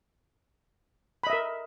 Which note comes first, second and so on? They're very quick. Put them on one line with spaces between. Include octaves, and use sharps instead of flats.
B5 D#5 E5 A#4